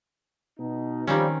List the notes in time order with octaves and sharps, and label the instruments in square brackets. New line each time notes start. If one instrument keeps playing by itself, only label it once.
[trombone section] B2 D#4
[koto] D#3 C4 C#4 [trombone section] F3 G3